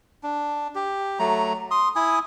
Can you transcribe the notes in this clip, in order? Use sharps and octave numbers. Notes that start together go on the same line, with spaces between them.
D4
G4
F#3 A3 A#5
C6 D#6
E4 G#5 D#6